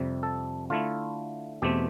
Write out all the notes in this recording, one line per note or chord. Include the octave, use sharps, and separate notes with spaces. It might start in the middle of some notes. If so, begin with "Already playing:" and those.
Already playing: F2 C3 G3
A4
D3 A3 E4 F4
E2 B2 A3 C4 G4